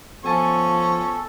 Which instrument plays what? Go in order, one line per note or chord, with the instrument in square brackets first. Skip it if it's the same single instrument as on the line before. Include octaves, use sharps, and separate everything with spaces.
[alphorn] F3 [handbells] B3 G#5 A6 [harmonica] C#4 C#6 [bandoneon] A4